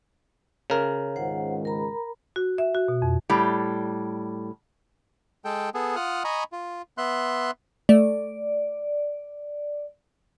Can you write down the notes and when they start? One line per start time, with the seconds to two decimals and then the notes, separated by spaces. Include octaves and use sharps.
0.70 C#3 A#4
1.16 C#2 G#2 D#3 C5 F#5
1.65 A#4 A#5 B5
2.36 F#4
2.58 E5
2.75 F#4
2.88 B2
3.02 F2
3.30 A2 G3
5.45 G#3 A4 G5
5.74 B3 G#4 A4
5.96 F4 F#5 D#6 F6
6.24 D#5 G#5 A#5 B5 C#6
6.52 F4
6.98 B3 E5 C6 F#6
7.89 A3 D5